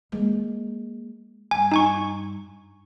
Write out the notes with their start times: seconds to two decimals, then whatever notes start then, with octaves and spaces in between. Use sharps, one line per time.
0.12 G#3 A#3
1.51 G2 G#5
1.71 D#4 G#5 C#6